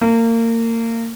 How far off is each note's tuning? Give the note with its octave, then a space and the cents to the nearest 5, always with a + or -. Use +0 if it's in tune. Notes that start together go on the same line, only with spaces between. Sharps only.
A#3 -30